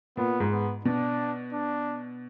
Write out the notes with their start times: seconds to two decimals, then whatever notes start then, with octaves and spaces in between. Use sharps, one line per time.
0.17 A#2 B3
0.40 G#2
0.51 B3
0.85 B2 D4
1.53 D4